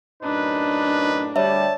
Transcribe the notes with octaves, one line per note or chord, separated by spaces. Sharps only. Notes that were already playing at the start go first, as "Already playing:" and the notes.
F#2 A2 D4 D#4 B4
D2 G3 C#5 D5 E5 A5